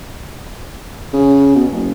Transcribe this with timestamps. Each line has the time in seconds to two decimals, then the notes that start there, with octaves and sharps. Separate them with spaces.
1.13 C#3
1.55 B2
1.72 F#1